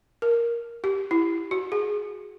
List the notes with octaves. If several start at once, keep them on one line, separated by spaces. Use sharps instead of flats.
A#4
G4
E4
F#4
G#4